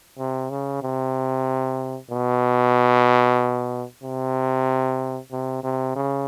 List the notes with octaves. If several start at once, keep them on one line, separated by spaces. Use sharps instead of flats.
C3
C#3
C3
B2
C3
C3
C3
C#3